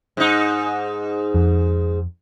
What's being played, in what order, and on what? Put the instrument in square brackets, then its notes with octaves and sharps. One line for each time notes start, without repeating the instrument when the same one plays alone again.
[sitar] G#2 D#4
[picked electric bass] F2